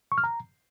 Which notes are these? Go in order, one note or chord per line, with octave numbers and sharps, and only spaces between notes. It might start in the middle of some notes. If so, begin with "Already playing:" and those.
C#6
F6
A#5